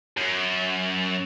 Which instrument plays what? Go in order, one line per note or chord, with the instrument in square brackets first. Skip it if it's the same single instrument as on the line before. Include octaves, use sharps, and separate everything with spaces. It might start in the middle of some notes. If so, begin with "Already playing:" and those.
[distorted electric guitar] F#2